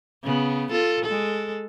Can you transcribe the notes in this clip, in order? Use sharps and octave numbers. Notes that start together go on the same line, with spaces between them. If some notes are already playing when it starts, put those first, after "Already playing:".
C#3 B3
F4 A4
G#3 A4